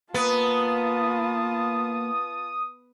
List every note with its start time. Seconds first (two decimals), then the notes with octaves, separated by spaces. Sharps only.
0.14 A#3 B3 F4 B4 A5 D#6